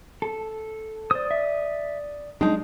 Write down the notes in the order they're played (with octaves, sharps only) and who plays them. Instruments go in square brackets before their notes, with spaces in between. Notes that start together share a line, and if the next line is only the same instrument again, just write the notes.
[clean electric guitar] A4
[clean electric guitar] C5 [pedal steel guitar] D5 D#6
[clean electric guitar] E5
[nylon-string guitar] G#3 D#4 [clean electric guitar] D4 G5 A5